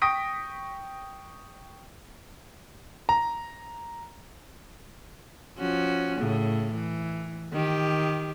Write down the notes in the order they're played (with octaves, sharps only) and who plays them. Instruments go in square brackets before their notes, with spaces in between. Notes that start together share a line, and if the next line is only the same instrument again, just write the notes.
[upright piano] G5 C#6 D#6 A#6 B6 D7
[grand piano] A#5
[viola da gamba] F3 C#4 F#4
A2 C#3
E3
D#3 G4